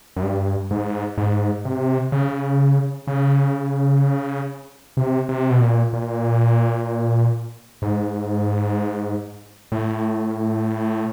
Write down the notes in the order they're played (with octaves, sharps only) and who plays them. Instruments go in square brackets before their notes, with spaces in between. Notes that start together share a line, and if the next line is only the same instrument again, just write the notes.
[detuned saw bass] F#2
G2
G#2
G#2
C3
C#3
C#3
C3
C3
B2
A#2
A#2
G#2
A2